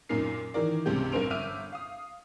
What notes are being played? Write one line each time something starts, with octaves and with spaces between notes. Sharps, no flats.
F#2 A#2 D#4 A#4 C7
D#3 E3 A#4 D5
C#2 G2 C3 C4 G4 G6
A#1 G2 A#4 C5 D7 F7
G1 E5 D6 F6 D#7
F5 D#6